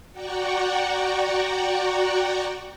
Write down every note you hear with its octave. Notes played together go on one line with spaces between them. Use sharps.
F#4 D5 F#5 G5 A#5 C#6